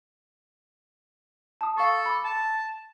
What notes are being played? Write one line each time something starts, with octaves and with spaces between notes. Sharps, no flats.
A5 D#6
A4 F5 C#6
B5 D6
A5